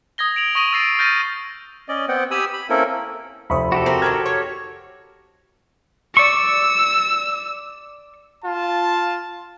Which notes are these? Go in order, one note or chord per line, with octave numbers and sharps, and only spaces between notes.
D#6 G#6 A#6 G7
D7 F7 F#7
C#6 D#6 A#6 D#7 F#7
E6 A6 A#6 C7 D7
F6 G6 A6 A#6 D#7
C#4 D5 D#5
B3 C4 F#5 G5
G4 G#5 B5 D#6 E6
B5
A#3 C4 C#4 E4 A4 A#4
F1 C5 E5 B5 C#6 D#6
F#4 G4 A4
C4 A#4
D#3 C4 A#4 F6 G#6
C#5
D5 C#6 E6
F4 A5